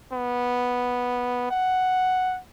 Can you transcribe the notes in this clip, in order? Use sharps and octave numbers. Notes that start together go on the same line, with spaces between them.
B3
F#5